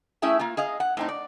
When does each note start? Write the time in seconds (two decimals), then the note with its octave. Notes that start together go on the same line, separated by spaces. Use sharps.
0.22 A3 C#4 E4 G#4 E5 G5
0.39 A#3 F4
0.57 G#4 D#5 F5
0.80 F#5
0.97 A2 C4 D#4
1.09 D5